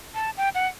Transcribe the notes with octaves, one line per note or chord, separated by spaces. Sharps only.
A5
G5
F#5